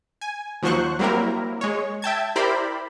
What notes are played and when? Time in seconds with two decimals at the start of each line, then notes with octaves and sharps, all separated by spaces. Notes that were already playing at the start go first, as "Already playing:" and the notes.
0.21 G#5
0.63 D#2 F3 F#3 C5 C#6 F#6
0.99 F#3 G3 A#3 C4 E4 A#4
1.61 G#3 C#5
2.02 E5 G5 A5 G#6
2.36 E4 G4 A#4 C5 D5 B5